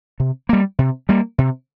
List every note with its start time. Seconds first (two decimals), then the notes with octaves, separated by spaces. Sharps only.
0.20 C3
0.49 G3 A#3
0.79 C3
1.09 G3 A#3
1.38 C3